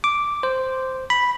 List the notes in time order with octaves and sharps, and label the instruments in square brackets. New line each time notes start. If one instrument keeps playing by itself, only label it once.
[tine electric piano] D6
C5
B5